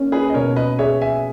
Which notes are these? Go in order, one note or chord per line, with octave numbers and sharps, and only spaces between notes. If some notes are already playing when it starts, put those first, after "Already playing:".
Already playing: A#3 C#4
G#4 B4
D#5
B2 A#4 C#5
B4 D#5
G#4 C#5 E5
E5 G#5